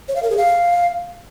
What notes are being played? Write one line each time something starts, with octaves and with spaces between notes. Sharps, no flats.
C#5
F5
A#4
G#4
F5